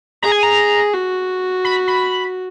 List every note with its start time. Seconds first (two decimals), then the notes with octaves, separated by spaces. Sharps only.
0.23 G#4 A#5
0.32 G#5
0.43 A#5
0.94 F#4
1.65 B5
1.88 B5